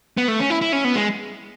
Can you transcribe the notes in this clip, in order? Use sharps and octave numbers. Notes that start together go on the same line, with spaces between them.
B3
A3
C#4
E4
E4
C#4
B3
G#3